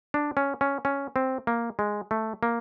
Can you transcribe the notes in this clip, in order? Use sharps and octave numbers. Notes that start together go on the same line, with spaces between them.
D4
C#4
C#4
C#4
C4
A#3
G#3
A3
A#3